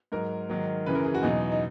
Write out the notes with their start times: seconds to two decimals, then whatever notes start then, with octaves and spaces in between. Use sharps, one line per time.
0.12 G#2 F#3 A#4
0.49 G#2 D#3 F#3
0.86 F#2 C#3 E3 B4
0.95 A#4
1.05 G#4
1.14 F#4
1.19 C#4
1.23 E2 B2 F#3 D#4
1.52 D#4